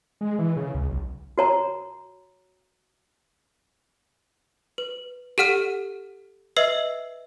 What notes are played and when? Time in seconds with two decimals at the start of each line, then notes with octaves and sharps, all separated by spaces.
0.21 G#3
0.39 E3
0.56 C#3
0.74 C#2
0.89 B1
1.38 F#4 C#5 A#5
4.78 B4
5.38 G4 A4 F#5 F6 D#7
6.56 B4 D#5 E5 E6 C7